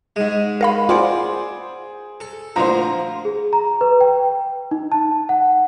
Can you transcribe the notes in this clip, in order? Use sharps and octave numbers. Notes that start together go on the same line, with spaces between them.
G#2 G#3
A#4 F5 B5
F4 G#4 C5 D5 F#5
A4
D2 A#2 F3 C5 A#5
G#4
A#5
B4
G5
D#4
A5
F#5